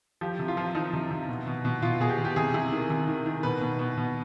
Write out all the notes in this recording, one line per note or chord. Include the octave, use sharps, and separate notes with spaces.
F3 G4
C3
F4
F3
F3 D#4
C3
C3
B2
B2
B2
B2 F4
B2 G#4
G4
B2
G4
C3 G#4
C3
D#3
C3
D#3
D#3
B2 B4
B2
B2
B2